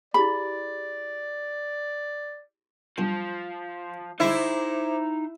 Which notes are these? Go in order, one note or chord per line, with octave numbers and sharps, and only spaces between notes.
E4 G4 G#4 D5 B5
B1 G2 F3
D3 G#3 D#4 E4 C5 E5 C6 D6